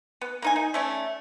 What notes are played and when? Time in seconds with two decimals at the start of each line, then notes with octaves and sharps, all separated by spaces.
0.21 B3
0.42 A#3 D#4 G#5
0.56 D#4
0.74 A3 C#4 D5